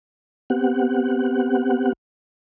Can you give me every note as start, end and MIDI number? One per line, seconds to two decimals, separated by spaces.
0.50 1.93 59
0.50 1.93 60
0.50 1.93 67
0.50 1.93 78